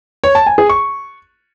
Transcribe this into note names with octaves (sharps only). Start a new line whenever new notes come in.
C#5
A5
G#5
G#4
C#6